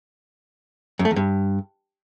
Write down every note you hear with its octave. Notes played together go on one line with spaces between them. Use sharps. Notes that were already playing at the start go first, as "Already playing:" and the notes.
F#2
A3
E2
G2